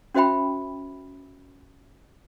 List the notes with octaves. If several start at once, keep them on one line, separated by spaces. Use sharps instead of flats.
C#4 F#4 C5 E5 G5 B5